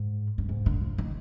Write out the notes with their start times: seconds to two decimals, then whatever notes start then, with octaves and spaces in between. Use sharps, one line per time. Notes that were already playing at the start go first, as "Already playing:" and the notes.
Already playing: G#2
0.38 G2
0.49 G#2
0.66 D3
0.81 F3
0.98 D#3